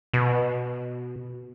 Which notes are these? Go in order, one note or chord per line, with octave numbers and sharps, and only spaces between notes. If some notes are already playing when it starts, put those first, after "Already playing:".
B2